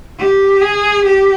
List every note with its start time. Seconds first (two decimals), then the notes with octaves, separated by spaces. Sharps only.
0.19 G4
0.61 G#4
1.05 G4